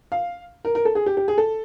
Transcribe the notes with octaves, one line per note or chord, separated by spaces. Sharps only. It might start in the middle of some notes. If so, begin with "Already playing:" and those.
F5
A#4
A#4
A4
G#4
G4
G4
G#4
A4